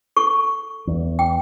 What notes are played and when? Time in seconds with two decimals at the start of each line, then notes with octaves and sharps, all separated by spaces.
0.16 A4 C#6
0.87 E2
1.19 G5